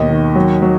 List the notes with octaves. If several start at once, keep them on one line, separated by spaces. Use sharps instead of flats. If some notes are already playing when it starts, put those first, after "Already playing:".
Already playing: D#2 B2 D#5
D#3
F#3
F#3